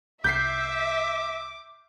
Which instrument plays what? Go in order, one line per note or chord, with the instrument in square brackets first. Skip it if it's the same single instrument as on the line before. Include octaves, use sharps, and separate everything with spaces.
[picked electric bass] C2 [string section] E5 [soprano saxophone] D6 [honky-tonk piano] G6 B6 C7